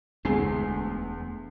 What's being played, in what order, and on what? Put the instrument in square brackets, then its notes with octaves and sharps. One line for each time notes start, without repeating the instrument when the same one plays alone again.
[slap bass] E1 A3 B3 [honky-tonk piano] D2 G#3 C7